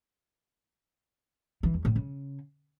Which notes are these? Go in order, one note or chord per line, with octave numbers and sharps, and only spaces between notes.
E3
E2
A2
C#3